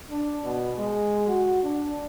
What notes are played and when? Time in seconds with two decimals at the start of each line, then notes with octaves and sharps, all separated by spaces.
0.11 D4
0.45 B2
0.78 G#3
1.28 F#4
1.63 D4